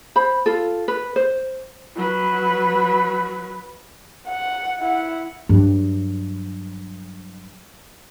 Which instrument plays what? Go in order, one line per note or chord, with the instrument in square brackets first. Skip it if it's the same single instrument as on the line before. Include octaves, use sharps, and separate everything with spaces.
[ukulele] C5 B5
F4 A4
B4
C5
[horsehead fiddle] F#3 B4
[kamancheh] F#5
E4 F#5
[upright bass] G2 F#3